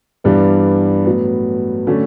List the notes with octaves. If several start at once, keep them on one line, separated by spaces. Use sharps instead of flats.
G2 E3 G3 B3 D4
A2 F#3 B3
D3 F#3 A3 C#4